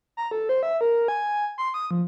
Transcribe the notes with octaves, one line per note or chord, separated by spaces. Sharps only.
A#5
A4
C5
E5
A#4
G#5
C6
D#6
F3